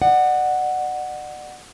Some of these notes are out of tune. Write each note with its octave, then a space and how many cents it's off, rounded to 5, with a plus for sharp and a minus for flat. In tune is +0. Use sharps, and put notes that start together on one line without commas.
D5 +40 F#5 +0